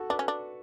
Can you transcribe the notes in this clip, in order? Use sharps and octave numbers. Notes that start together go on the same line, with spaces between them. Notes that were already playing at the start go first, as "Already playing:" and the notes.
Already playing: F#4 A4
D4 B4
C#4
D4